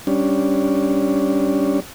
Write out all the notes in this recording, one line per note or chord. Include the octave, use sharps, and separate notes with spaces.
G3 C#4 D4